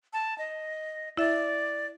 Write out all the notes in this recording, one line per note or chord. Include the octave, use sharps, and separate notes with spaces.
A5
D#5
E4 D5 E5